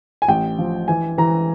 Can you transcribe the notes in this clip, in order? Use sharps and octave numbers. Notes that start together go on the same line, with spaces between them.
G#5
A1 G5
F3
E3 G#5
E3 A#5